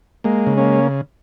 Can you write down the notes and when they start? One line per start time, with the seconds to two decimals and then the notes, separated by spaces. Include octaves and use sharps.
0.24 G#3 A#3
0.47 C#3
0.57 A#3 C#4